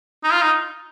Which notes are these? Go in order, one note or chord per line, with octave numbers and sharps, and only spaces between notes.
D#4
F4
D#4